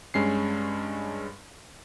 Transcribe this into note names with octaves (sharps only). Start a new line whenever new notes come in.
G2 G#3 C#4 C7